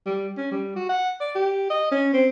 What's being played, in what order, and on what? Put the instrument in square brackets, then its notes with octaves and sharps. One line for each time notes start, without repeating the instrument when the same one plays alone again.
[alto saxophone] G3
C#4
G3
F#4
F#5
D5
G4
D#5
C#4
C4